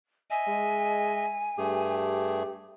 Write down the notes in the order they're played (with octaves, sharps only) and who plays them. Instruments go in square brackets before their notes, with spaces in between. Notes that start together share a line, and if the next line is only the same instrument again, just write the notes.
[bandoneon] D#5 E5 [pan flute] G#5
[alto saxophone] G#3
[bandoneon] G2 A3 G#4 [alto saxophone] G4